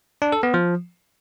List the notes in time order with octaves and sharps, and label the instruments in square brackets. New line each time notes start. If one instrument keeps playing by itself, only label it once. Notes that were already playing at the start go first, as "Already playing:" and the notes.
[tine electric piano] D4
A4
B3
F3